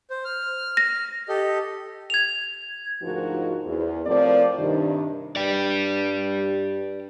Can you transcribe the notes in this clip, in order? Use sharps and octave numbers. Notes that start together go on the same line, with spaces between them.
C5
F6
A#6
G4 A4 D#5
G#6 F7
D2 G#2 F3 D#4 F#4 A#4
E2
A2 F3 C4 A#4 D5
G2 C3 D#3
G2 G4 D5